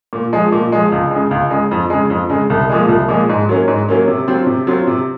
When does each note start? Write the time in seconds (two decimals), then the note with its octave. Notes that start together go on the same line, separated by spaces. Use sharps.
0.13 A#2
0.33 F3 G#3
0.52 A#2
0.72 F3 G#3
0.92 C#2
1.11 C#3 G#3
1.31 C#2
1.50 C#3 G#3
1.71 F2
1.90 C#3 G#3
2.10 F2
2.29 C#3 G#3
2.50 C2
2.69 A#2 F3 G#3
2.89 C2
3.09 A#2 F3 G#3
3.29 G#2
3.49 F#3 A#3 C#4
3.68 G#2
3.88 F#3 A#3 C#4
4.08 C3
4.28 F#3 C4 F4
4.47 C3
4.67 F#3 C4 F4
4.87 C3